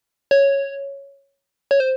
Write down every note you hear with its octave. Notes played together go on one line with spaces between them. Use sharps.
C#5
C#5
C5